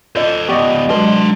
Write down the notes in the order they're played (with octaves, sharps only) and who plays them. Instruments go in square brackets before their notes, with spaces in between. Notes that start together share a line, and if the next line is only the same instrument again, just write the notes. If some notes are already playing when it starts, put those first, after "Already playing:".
[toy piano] F4 D5 D#5 [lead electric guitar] A4 C5
[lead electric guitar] F3 B3 [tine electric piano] G4 D5 D#5 [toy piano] C#6
[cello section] F#3 G#3 [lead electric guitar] D4 C6 [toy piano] F#4 B4 A5